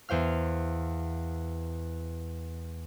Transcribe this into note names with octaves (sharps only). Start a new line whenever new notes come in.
E2 C5 F5 F6